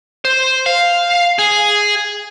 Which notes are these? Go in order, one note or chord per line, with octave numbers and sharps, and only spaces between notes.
C5
F5
G#4